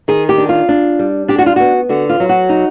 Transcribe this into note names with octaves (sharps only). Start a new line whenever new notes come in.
D#3 G#4
G4
D4
F4
D4
G3
D4 G4
F#4
F4
B3 F#4
D3 F#4
F4
F#3
F#4
D#4